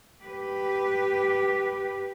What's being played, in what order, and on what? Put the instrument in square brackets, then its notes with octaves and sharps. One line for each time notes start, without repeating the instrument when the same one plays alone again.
[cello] G4 B4